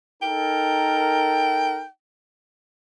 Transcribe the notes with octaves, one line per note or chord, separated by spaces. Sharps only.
D#4 A4 A#4 G5